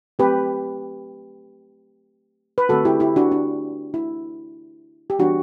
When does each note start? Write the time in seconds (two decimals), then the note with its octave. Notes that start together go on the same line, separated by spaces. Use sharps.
0.19 F#3 A3 C4 G4 B4
2.58 B4
2.69 D3 A3 C4 F#4 A4
2.85 E4 G4
3.00 E4 G4
3.16 D4 F#4
3.31 D4
3.94 E4
5.10 G4
5.19 E3 G3 B3 D4 F#4